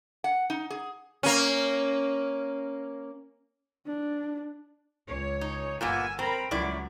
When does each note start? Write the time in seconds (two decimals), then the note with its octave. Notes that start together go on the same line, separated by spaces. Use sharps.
0.24 F#5
0.50 D#4
0.70 G#4
1.23 A#3 C#4
3.87 D4
5.07 C#2 C#5
5.41 D#4
5.81 G1 A#2 A#3 B3 G#5 E6
6.19 C4 A#4 A#5 B5
6.51 C#2 F#2 F#3 E4 D5